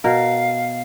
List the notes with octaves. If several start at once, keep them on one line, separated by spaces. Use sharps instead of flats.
B2 A#4 F5